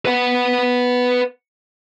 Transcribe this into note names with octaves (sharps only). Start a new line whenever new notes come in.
B4 F#5